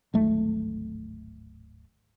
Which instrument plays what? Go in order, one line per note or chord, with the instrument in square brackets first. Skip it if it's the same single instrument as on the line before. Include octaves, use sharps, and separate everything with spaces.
[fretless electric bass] D1 G#1 A3